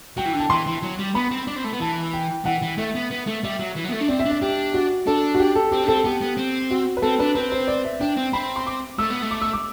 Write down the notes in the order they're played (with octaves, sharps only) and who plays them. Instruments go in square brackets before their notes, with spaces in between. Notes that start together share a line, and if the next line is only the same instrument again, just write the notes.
[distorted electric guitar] F#3 [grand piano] G5
[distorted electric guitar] E3
D3
[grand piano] A5
[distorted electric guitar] E3 [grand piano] C6
[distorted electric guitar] E3
F#3
G3
[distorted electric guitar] B3 [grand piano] B5
[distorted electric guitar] C4
D4
C4
A3
B3
[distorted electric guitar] E3 [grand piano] A5
[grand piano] G5
[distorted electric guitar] E3 [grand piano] F#5
[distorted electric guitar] E3
[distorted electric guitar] A3 [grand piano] E5
[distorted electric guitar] B3
B3
A3
[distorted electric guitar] G3 [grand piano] E5
[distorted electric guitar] F#3
E3
F#3
B3
A3
D4
[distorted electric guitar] C4 [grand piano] D5
[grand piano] E5
[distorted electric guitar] D4
[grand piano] E5
[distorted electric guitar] D4 [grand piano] G4
[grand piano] F#4
[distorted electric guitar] D4 [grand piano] A4
[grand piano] F#4
G4
A4
[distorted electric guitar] C4 [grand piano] G4
[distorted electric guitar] D4
[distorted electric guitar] C4 [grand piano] A4
[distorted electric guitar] B3 [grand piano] G4
[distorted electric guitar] B3
C4
[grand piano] F#4
B4
[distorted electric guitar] C4 [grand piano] A4
[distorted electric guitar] D4 [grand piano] B4
[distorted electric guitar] C4 [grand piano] B4
[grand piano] C5
D5
E5
[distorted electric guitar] D4 [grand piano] G5
[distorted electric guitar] C4
[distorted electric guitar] C4 [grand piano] B5
[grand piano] C6
D6
[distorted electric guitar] A3 [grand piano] E6
[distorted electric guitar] B3
A3
[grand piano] D6
E6
D6